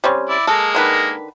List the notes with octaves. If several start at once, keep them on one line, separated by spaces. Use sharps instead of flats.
G3 C4 C#4
E4 D5
G#3 A#3 A4
D3 D#3 B4